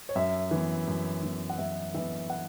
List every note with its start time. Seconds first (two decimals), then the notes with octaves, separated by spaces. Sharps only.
0.09 C#5
0.15 F#2 E5
0.51 E3 B3
0.87 F#2
1.23 E3 B3
1.50 F#5
1.58 F#2 E5
1.94 E3 B3 E5
2.30 F#5